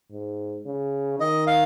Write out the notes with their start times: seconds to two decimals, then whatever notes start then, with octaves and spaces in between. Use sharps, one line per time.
0.11 G#2
0.66 C#3
1.19 D#3 D#5
1.47 F5